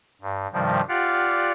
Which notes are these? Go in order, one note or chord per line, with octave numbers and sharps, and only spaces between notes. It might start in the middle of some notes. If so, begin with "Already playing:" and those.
G2
G2 C3 D#3 F3 G3
F4 G4 D5 F5 F#5